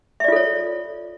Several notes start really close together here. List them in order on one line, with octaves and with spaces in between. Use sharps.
E5 D5 F4 A4 C#5